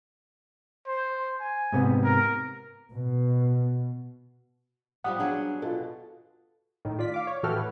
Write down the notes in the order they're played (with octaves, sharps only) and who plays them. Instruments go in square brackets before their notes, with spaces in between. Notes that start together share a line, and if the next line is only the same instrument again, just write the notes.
[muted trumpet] C5
G#5
[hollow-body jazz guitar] G#2 C3 B3
[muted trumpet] A#4
[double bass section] B2
[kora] F3 G3 B3 [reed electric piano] F#5 D#6
[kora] F#3 G#4 F#5 [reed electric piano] D4
[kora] B2 [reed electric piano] F4 A4
[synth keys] A2 D#3
F4 D5 B6
F5 D6
C#5
A2 E3 F#4 G4 A4 F6
B4